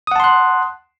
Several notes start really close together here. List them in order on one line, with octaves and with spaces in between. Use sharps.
D#6 F#5 A5 C6 F#6